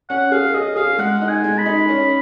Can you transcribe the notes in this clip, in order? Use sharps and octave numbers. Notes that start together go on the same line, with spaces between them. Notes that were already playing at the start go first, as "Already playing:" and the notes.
C#4 F#5
G#4 F5
G#4 D#5
G#4 F5
G#3 F#5
D#4
G#5
G#3
B5
D#4
C#4